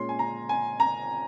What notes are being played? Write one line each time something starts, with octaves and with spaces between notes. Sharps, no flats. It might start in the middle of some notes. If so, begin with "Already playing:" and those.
Already playing: A#2 G#3 C#4 C6
G#5
A#5
G#5
A#5